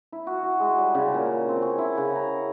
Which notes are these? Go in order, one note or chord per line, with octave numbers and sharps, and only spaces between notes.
E4
F#4
F#4
G#3
G3
C#3
A#2
C4
C#4
E4
C#3
A#5